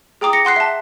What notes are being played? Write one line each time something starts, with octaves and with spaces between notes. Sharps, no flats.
G#4 G5 A#5 D6 D#6
A#6 C#7
F#5 C6 F#6 C7
E5 A5